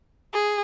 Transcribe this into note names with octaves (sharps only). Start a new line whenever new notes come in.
G#4